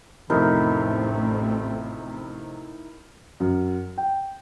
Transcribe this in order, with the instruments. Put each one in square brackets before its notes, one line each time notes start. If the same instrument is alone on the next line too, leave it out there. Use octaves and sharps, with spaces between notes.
[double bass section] A1 A3 C4 [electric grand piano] F2 C3 [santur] D#4 E4 A#4
[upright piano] F#2
G5